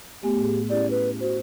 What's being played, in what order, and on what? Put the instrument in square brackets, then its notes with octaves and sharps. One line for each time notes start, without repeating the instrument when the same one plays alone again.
[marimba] A3 B3 G#5 [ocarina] G4
[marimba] A2 G#4
[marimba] C#4 E4 G4 [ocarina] D5
[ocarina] B4
[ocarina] F#4 [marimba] C5